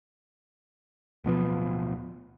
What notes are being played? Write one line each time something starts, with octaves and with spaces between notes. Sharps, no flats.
D1 B2 F3 B3